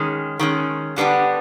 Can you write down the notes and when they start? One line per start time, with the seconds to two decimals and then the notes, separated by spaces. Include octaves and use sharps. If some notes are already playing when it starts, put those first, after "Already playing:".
Already playing: D#3 G#3 C#4
0.39 D#3 G#3 C#4
0.96 D3 G3 B3 D4 G4